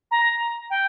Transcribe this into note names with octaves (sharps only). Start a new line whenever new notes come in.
A#5
G5